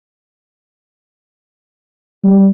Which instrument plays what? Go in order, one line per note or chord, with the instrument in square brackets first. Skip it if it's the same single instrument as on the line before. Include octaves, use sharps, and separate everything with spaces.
[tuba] G3